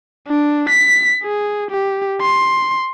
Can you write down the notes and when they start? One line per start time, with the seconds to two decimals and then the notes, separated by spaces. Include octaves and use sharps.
0.28 D4
0.69 B6
1.23 G#4
1.71 G4
2.21 C6